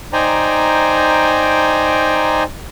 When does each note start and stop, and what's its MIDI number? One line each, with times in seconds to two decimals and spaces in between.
0.13 2.43 63
0.13 2.43 72
0.13 2.43 74
0.13 2.43 79
0.13 2.43 80
0.13 2.43 82